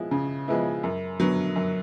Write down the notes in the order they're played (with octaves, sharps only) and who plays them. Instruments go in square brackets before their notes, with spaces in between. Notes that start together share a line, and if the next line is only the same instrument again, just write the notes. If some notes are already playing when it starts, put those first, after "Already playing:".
Already playing: [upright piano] F3 G#3 B3 E4
C#3
F3 G#3 B3 E4
F#2
D3 F#3 B3
F#2